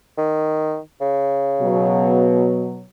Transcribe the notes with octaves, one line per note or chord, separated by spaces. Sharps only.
D#3
C#3
B2 F#3